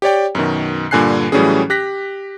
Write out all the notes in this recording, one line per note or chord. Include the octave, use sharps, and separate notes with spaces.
G4 C#5 D5 G5
F#2 B2 D#3
G2 A#2 D3 G#5 F#6 C7
A2 E3 F#3 G3 C#4 G#4
G4 F#6 A#6 B6